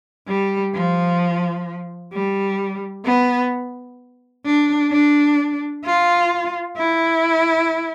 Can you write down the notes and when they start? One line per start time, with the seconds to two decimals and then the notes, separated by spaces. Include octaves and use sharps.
0.27 G3
0.73 F3
2.13 G3
3.05 B3
4.45 D4
4.92 D4
5.84 F4
6.77 E4